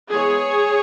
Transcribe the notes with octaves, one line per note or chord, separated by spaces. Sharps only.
E3 G#3 B3 G#4 C#5